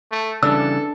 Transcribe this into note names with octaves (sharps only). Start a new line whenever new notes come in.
A3
C#3 E3 G3 D4 A4 E6